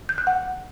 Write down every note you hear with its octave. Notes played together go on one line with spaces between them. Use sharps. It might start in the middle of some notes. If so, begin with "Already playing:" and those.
G6
F#6
F#5